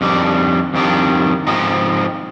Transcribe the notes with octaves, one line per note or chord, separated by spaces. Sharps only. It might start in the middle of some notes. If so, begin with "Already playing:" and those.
F2 D#3 G3 D4
F2 D#3 G3 D4
G#2 F3 C4 D#4